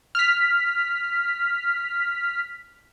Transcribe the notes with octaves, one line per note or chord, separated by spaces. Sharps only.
F6 B6